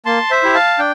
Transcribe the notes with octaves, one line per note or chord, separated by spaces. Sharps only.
A#3 A5 C6
C5 E5
E4 G4
F5 A5
D4 G5